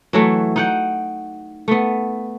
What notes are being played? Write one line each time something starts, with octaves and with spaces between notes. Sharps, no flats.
E3 F#3 A3
D#4 F#5 G5
A3 B3